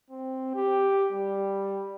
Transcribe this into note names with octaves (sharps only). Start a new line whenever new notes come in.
C4
G4
G3